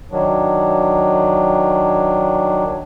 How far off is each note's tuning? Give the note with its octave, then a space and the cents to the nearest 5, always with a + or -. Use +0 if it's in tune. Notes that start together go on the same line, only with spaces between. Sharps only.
D#3 +0 F#3 +0 D4 +0